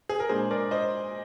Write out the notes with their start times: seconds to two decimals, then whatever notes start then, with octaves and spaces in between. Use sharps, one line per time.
0.09 G#4
0.20 A#4
0.29 A#2 G#3 D4 G#4 C5
0.51 A#4 D5
0.71 C5 D#5